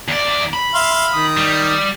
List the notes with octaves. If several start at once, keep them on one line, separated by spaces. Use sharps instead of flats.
E2 D5
B5
E5 F5 C6
D#3 D#6
G3